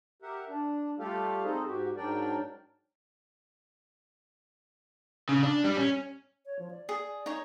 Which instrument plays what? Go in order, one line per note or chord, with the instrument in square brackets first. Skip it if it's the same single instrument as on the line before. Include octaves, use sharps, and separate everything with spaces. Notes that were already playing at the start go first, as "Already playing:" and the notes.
[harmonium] G4 A#4 E5 F#5
D4
G3 A3 F4 G4 A4 F5
C4 D#4 G#4 A4 C5 D#5
G#2 F#4 G4
G#2 F#3 D4 A#4 D5 G5
[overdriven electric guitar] C#3
D4
G3
C#4
[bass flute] C#5
F3
D5
[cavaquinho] G#4
D#4 C#5